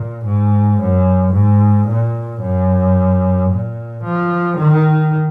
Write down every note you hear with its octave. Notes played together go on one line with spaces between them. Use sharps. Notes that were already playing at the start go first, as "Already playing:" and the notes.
Already playing: A#2
G#2
F#2
G#2
A#2
F#2
A#2
F3
D#3